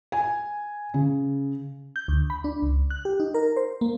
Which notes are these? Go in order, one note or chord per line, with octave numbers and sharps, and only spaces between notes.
G#5
C#3
G6
D2
B5
D4
C#2
F#6
G4
D#4
A#4
C5
A#3